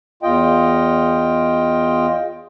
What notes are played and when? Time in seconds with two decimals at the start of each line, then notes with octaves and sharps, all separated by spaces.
0.23 E2 F4 D#5 G5